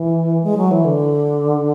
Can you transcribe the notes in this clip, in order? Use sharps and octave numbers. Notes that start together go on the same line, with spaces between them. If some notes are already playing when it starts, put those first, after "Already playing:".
Already playing: E3
G#3
F#3
E3
D3